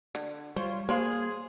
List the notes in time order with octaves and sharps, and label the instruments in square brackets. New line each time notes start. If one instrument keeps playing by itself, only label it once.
[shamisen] D3
[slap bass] G3 [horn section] F4 C#5 [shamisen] C5
[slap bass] A#3 [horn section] G#4 [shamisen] A#4 C#5 F5 [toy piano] C5 B5 C6